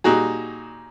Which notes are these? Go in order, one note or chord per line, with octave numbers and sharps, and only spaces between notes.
A#2 G3 D#4 F#4 G#4